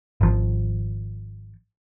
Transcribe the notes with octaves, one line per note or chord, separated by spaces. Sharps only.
G#1 F3